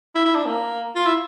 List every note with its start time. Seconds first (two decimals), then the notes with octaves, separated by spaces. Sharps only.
0.15 E4
0.25 E4
0.35 D4
0.46 A#3
0.96 F4
1.06 E4